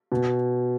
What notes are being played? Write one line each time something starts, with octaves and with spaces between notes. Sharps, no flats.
B2